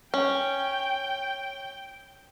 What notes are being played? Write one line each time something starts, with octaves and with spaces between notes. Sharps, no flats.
C#4 G5